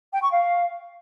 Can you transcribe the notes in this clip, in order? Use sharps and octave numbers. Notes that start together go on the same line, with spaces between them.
G5
C#6
F5